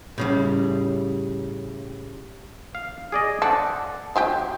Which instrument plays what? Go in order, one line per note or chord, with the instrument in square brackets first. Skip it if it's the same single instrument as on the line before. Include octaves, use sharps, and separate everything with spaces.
[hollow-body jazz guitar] A2 C#3 G3
[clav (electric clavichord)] F5
G#4 D5 D#5
[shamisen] A4 [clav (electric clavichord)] C5 D5 F#5
[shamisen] F3 F#3 G4